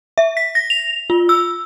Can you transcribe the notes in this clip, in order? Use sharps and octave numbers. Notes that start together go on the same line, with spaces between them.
E5
B6
A#6
F7
F4
E6